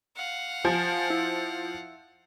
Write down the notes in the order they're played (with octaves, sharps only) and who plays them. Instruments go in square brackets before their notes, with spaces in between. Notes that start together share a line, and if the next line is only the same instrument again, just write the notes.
[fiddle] F5 F#5
[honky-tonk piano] F3 [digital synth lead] G#5
[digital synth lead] E4